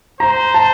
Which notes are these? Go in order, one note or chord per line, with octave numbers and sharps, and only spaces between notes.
C5 A#5
A5